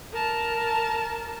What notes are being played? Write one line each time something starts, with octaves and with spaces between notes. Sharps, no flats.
A#4 A5